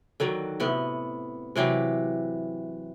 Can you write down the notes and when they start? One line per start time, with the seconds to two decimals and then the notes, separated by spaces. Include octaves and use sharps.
0.20 D3 D#3 F#3
0.60 A2 C3 B3
1.56 C3 E3 F#3 G4